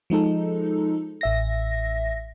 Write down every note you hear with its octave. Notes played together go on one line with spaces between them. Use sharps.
F3 G#3 D#4 A4
A1 E5 A#6